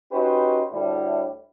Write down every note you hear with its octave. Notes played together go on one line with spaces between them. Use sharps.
C#4 D#4 F#4 G4 B4 C5
D2 A2 G3